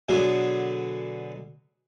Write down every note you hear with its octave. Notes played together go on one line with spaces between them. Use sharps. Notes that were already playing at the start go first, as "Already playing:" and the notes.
B2 D3 F#3 G#4